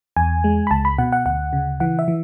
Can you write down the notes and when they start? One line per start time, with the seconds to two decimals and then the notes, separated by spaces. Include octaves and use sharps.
0.16 E2 G#5
0.44 G#3
0.67 B5
0.71 C#2 A5
0.85 B5
0.98 B2 F#5
1.12 F#5
1.26 D2 F#5
1.53 C#3
1.80 E3 F#5
1.99 E5
2.08 E3